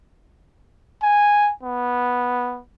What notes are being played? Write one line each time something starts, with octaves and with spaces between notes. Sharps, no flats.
G#5
B3